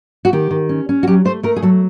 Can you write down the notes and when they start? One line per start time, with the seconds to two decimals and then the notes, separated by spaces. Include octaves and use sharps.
0.25 F#4
0.33 D#3 G4
0.51 D#3
0.69 C#4
0.89 C#4
1.03 F#4
1.07 F#3 G4
1.25 A3 C5
1.43 A3 A#4
1.56 G#4
1.62 F#3 A4